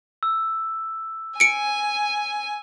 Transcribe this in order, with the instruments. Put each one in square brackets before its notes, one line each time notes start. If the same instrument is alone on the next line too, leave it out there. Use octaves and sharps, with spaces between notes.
[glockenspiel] E6
[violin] G#5 [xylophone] C#7 D7